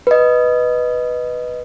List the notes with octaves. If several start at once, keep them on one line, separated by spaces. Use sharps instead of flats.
B4 D#5